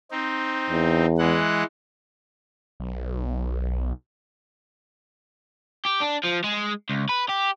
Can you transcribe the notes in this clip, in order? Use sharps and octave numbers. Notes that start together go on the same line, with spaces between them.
C4 D#4
E2
E3 G#3 F#5
B1
G4
D4
F3
G#3
C#2
B4
G4